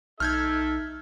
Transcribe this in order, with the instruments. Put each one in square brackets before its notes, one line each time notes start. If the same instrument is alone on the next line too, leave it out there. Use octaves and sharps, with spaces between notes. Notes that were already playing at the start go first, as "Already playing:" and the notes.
[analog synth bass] B1 [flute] D#4 [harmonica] A4 E5 [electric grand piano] F6 G6 G#6